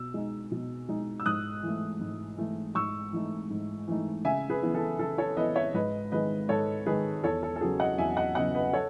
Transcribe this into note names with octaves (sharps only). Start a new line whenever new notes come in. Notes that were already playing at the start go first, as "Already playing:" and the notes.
Already playing: B2 E6
G#3 D#4
B2
G#3 D#4
E6
G#2 D#6 F#6
E3 A3
G#2
E3 A3
G#2 C#6 E6
E3 A3 D#4
G#2
E3 A3 D#4
C#3 E5 G#5
G#4 B4
E3 B3 E4
A4
C#3 A4
A4 C#5
E3 B3 E4 B4 D#5
C#5 E5
G#2 B4 D#5
D#3 G#3 B4 D#5
G#2 A4 C#5
D#3 G#3 G#4 B4
E2 A4 C#5
A4
A4
C#3 F#3 B3 G#4
D#5 F#5
E2 E5 G#5
D#5 F#5
C#3 F#3 B3 D#5 F#5
B4 D#5
A4 C#5